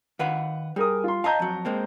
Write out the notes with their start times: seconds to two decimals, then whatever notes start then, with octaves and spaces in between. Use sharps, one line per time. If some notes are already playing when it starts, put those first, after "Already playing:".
0.19 D#3 B4 F5 F#5
0.76 G3 G#4 A#4 D#6
1.04 F4 C6
1.24 D#5 F5 A5 A#5 G6
1.40 F2 F#3
1.65 G#3 A#3 C4